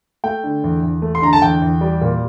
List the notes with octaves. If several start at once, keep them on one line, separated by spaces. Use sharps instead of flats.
A3 G5
D3
E2
E2
A3
C6
D3 A#5
A5
E2 G5
E2
G3
A#2